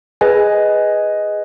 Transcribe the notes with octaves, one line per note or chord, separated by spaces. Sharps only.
G#4 B4 D#5 G#5